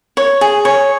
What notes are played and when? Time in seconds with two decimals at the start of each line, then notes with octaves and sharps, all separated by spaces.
0.17 C#5
0.41 G#4
0.65 C#5